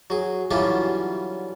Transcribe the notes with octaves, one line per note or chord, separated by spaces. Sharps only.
F#3 G#4
D3 E3 F#3 G3 C#4 F4